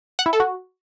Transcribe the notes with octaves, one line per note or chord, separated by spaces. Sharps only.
F#5
E4
A4
F#4